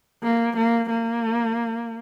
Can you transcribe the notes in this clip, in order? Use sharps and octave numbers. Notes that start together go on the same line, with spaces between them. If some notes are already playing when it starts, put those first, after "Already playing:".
A#3
A#3
A#3